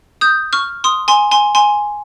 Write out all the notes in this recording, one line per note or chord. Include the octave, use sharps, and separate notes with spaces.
D#6 G6
C#6 F6
C6 D#6
G#5 C6
G#5 C6
G#5 C6